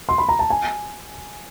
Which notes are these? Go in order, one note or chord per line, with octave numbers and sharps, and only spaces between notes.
C6
B5
A#5
A5
G#5